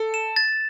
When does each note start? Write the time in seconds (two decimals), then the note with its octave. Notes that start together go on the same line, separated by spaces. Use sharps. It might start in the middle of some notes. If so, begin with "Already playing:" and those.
Already playing: A4
0.14 E7
0.36 A6